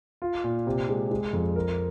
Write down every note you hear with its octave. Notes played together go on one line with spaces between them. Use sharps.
F4
A#2
C3
G#3
G#3
F2
A#4